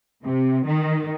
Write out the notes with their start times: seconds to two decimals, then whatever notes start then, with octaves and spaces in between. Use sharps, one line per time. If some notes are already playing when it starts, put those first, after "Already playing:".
0.24 C3
0.66 D#3